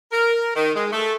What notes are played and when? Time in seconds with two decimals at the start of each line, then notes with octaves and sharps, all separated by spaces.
0.12 A#4
0.55 D#3
0.74 G#3
0.92 A3